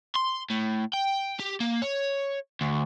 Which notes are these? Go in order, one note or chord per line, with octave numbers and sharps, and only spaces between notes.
C6
A2
G5
G4
A#3
C#5
D2